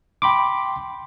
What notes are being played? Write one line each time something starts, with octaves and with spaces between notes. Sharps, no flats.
G5 B5 C6 D6